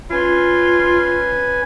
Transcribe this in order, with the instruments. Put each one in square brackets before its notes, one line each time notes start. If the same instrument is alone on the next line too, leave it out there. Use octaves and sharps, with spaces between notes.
[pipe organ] C#4 B4 G#5 [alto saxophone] F4